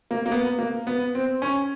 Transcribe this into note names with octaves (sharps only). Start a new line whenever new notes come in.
A#3
A#3
B3
A#3
B3
C4
C#4